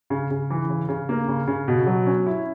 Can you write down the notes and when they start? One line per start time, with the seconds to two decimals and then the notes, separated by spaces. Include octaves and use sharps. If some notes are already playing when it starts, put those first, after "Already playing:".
0.10 C#3
0.30 C#3
0.50 E3
0.69 C#3
0.89 C#3
1.09 A#3
1.28 C#3
1.47 C#3
1.68 B2
1.86 F#3
2.06 C#4
2.26 E4